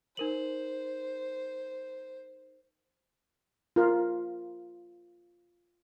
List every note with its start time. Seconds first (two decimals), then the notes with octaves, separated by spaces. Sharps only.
0.17 D#4 A#4 C5 F#7
3.76 F4 A#4